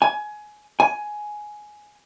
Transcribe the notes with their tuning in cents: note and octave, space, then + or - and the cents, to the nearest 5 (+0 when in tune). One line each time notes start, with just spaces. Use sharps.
G#5 +20
G#5 +10